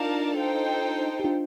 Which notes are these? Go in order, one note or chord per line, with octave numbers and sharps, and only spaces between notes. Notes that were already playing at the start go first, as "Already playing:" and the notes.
Already playing: D4 D#4 F4 A#4 D5 F5 A5
D#4 A4 C5 G5
G4
D4 F4